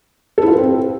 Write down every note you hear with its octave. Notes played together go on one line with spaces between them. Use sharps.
A4
E4
F4
B4
C4